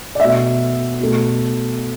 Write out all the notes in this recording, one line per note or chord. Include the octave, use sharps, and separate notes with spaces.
D5
B2 A3 E5
B2 A3